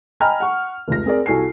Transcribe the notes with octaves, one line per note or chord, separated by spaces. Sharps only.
D#5 G5 G#5 A#5 B5 F6
F#5 C#6
F1 C#2 A#6
C4 G#4 A#4 D5
C2 F#4 A4 G#5 C7